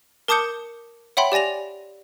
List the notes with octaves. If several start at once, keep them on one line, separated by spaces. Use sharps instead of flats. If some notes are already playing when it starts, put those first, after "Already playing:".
A#4 A5 D6 D#6 G6 C#7
C#5 E5 F#5 G5 B5 C6
G4 D5 G#5 A#6 F7